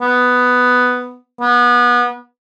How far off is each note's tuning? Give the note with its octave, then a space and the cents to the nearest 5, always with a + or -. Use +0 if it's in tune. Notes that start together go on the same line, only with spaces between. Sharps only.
B3 +5
B3 -25